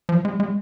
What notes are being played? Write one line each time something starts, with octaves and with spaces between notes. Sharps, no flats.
F3
G#3
G#3